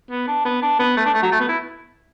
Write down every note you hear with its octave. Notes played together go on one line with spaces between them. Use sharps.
B3
D4
B3
D4
B3
A3
D4
A3
F#3
A3
B3
E4